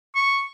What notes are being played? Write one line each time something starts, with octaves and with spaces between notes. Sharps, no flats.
C#6